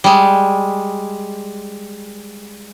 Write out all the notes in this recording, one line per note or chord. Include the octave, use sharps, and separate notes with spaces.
G3 G#3